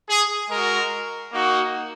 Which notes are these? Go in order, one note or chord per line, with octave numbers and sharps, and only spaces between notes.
G#4
G#3 F#4 A#4
A#3 D#4 F#4